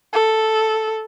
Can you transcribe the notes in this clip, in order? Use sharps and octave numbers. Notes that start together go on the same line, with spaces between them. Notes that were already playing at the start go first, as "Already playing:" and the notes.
A4